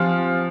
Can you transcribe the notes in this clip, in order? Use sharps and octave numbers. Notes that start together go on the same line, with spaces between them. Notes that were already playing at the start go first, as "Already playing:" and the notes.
Already playing: F3 C4 F4 G4 C5 F5 G#5